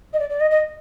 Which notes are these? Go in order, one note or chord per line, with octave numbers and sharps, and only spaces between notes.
D#5
D5
D5
D#5
D#5